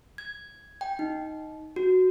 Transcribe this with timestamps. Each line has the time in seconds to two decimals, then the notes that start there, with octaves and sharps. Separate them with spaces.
0.18 G#6
0.81 G5
0.99 D#4
1.76 F#4